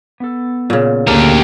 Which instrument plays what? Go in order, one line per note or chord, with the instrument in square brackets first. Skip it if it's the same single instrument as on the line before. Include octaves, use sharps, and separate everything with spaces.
[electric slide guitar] B3 A4
[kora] A#2 C#3
[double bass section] D2 D3 A#3 [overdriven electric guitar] G4 A#4 [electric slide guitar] F5 A5